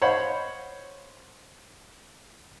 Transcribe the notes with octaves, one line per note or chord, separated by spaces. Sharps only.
C5 C#5 D#5 F5 F#5 B5